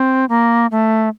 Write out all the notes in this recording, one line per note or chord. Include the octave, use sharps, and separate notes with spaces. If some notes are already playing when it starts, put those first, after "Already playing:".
Already playing: C4
A#3
A3